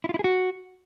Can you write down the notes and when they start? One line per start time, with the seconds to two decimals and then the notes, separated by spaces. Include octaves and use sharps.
0.04 E4
0.09 F4
0.14 E4
0.19 G#4
0.24 F#4